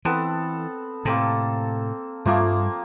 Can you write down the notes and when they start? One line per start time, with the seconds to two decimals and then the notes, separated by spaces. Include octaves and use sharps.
0.05 E3 B3 C4 A4
1.05 A2 C3 A#3 C4 A4
2.26 G2 F3 G3 A3 A#3 C4